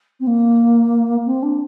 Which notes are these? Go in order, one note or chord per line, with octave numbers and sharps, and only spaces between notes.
C4
A#3
C4
D4